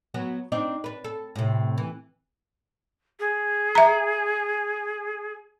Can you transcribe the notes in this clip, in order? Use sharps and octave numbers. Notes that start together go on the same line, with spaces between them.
F#3 B3 F#4
C4 D4 D#4
D4 B4
A4
A2 C3
E3
G#4
E5 A#5